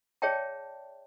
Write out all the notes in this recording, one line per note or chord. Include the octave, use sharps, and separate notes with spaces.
G#4 C#5 D5 E5 G5 A5